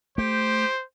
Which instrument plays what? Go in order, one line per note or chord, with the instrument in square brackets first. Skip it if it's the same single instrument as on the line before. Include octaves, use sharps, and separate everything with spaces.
[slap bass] A3 [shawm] G4 [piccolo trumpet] C5